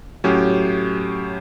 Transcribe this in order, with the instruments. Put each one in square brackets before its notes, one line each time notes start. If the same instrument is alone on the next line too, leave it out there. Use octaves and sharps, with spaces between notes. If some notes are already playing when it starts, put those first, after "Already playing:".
[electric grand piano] A2 F#3 C#4 G4